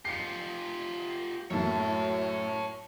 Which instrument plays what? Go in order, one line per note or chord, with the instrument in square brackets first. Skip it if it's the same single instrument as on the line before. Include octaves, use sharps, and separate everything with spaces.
[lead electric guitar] F4 G4 [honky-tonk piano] C7 C#7
[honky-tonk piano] F#2 A2 [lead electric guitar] C#5 A5